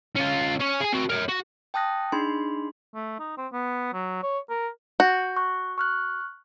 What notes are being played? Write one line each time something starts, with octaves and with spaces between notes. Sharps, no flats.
C#4 F4
C#4 C#5
G#4 G#5
C4 F#4
A#4 C#5
F#4
G5 A5 D#6 F#6 A#6
D4 D#4 G#4 B5 C6
A3
D#4
C4
B3
F#3
C#5
A#4
F#4 G6
C#6 F#6
C#6 F6 F#6